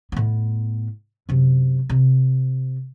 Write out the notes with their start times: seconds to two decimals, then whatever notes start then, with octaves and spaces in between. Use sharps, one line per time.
0.12 A2 B3
1.29 F#2 C3
1.89 C3